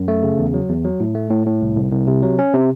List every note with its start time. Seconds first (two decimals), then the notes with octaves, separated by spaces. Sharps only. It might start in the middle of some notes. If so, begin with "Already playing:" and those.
Already playing: F#2
0.08 A3
0.23 C#3
0.39 E2
0.54 F#3
0.69 E2
0.85 F#3
1.00 A2
1.15 A3
1.30 A2
1.46 A2
1.61 C2
1.77 C2
1.92 C2
2.07 C3
2.22 F#3
2.39 C#4
2.54 C3